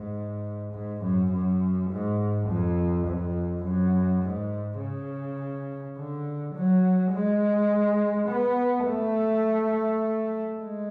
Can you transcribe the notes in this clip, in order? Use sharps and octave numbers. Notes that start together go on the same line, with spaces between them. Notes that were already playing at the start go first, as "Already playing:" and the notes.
Already playing: G#2
G#2
F#2
F#2
G#2
F2
F2
F#2
G#2
C#3
D3
F#3
G#3
B3
A3
G#3